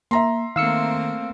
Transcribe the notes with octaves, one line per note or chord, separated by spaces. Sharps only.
A#3 E5 A#5 C6
D#3 A3 A#3 C4 F5 E6 C#7